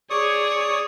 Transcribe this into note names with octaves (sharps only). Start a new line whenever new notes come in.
G#4 C#5 D5 C#6 D#6